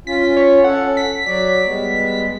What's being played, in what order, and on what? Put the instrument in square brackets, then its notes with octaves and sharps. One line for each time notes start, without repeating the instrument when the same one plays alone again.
[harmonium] C#4 F4 [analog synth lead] B6
[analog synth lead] C#5
[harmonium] C#4 A4 [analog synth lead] F#5
[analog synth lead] B6
[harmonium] F#3 F#4 D5 [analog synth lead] B6
[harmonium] G3 G#3 B3